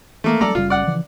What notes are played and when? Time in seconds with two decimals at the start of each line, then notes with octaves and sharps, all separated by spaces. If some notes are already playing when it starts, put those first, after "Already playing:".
0.24 E3 A3 A#3
0.41 F#3 G3 B3 A4 D5 A#5
0.55 F#1 C#3 G3 F4
0.70 D5 F#5
0.87 C#3 E3 F3